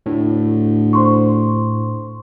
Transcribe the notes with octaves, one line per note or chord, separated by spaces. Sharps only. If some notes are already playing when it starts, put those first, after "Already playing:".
D2 A2
C5 C6 C#6